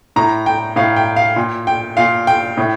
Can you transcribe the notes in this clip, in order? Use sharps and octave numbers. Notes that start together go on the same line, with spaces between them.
A2 A#5
G5
A2 F5
G5
F5
A#2
G5
A#2 F5
G5
A2